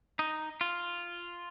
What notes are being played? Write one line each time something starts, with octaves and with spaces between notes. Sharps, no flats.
D#4
F4